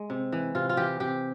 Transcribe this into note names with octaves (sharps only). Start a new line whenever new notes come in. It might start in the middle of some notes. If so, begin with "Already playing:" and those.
Already playing: G#3
C3
E3
C3 F4
F4
E3 G4
C3 G4